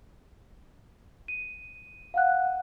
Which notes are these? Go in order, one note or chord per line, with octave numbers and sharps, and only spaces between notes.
D#7
F5 F#5 F#6